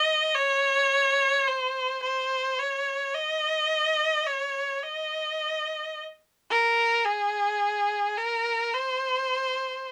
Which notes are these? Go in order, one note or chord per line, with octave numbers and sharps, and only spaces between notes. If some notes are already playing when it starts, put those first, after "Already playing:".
Already playing: D#5
C#5
C5
C5
C#5
D#5
C#5
D#5
A#4
G#4
A#4
C5